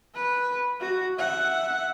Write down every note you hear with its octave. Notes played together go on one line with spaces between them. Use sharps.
B4
F#4
E5 F#5